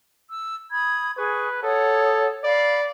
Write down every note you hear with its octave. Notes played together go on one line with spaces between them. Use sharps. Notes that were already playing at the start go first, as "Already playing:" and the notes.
E6
B5 D#6 G#6
G#4 B4 C#6
A4 C#5 F#5 D#6
D5 F5 B5